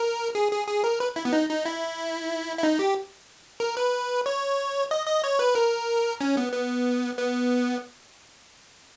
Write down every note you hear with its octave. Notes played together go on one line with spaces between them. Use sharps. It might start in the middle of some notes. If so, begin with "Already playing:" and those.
Already playing: A#4
G#4
G#4
G#4
A#4
B4
E4
B3
D#4
D#4
E4
E4
D#4
G4
A#4
B4
C#5
D#5
D#5
C#5
B4
A#4
C#4
B3
B3
B3